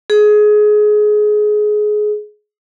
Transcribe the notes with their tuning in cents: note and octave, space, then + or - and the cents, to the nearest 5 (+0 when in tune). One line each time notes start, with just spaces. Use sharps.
G#4 +20